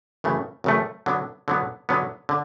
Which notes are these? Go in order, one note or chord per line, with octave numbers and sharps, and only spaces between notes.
F#2 C#3 E3 A3
F#2 C#3 E3 A3
D3 F#3 B3
D3 F#3 B3
D3 F#3 B3
D3